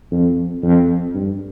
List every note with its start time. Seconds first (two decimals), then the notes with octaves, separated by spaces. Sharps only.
0.12 F2
0.62 F2
1.14 G2